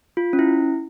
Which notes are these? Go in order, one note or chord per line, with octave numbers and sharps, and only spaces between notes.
F4
C#4
E4